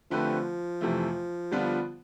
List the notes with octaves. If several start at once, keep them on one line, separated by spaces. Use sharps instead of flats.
D3 F3 A3 C4 G4 B4
F2 C3 E3 A3
D3 G3 B3 D4 F4